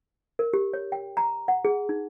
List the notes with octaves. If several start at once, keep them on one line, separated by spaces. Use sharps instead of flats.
A#4
G4
C#5
G5
A#5
F#5
G#4
D#4